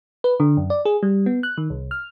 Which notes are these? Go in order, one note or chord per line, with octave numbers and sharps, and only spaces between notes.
B4
D3
F#2
D5
G#4
G3
B3
F#6
D#3
C2
F6